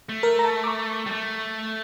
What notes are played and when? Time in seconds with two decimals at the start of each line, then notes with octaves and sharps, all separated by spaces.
0.09 A3
0.23 A#4
0.39 A#5
0.45 A5
0.64 D6
0.67 C#6
1.06 G3
1.12 A3